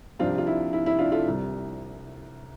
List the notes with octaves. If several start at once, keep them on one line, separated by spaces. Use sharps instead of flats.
C2 C3 F3 C4 D4 F4
F4
E4
E4
E4
D4 F4
F4 A4
C2 C3 G3